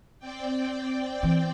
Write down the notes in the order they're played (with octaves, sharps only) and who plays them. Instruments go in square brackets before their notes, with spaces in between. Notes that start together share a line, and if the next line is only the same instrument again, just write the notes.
[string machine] C4 D5 G5
[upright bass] E3